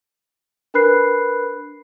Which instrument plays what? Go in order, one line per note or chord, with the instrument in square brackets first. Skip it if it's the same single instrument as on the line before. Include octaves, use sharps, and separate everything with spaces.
[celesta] D4 A#4 B4 B5 F#6 C7